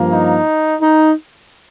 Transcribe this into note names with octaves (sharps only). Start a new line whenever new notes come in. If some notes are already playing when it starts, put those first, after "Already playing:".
Already playing: G2 F3 A#3
D#4
D#4